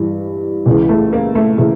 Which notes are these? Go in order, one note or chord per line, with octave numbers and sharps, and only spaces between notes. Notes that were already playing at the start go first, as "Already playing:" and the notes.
Already playing: G2 E3
C#2 C#3 E3
A3
A#3
A3
C#3 E3 A3